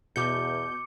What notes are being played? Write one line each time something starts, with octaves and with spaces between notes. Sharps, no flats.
E2 B2 D6 G6 C#7